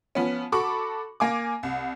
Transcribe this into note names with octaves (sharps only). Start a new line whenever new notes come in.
F3 B3 C#4
F#4 A4 B5 C#6 D6
A#3 G#5 D6
C2